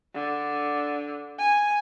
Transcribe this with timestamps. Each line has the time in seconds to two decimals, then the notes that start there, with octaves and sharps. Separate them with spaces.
0.14 D3
1.38 G#5